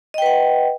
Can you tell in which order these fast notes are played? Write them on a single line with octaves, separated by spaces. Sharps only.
D#5 G5 B4 F#5